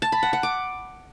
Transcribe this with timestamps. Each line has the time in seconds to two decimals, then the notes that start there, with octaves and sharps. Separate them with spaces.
0.02 A5
0.12 B5
0.23 F#5
0.33 F#5
0.43 D6